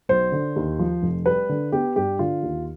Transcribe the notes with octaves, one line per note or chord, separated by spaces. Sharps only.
B1 C5
D3
D#2
F3
F1
G3 B4
D3
B3 G4
G2 G4
D3 F4
D#2